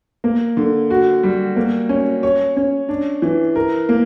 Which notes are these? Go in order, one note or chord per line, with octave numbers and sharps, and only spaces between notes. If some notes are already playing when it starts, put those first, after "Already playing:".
A#3
D3
F#4
G3
A#3
C#4
C#5
C#4
D4
E3
A#4
A#3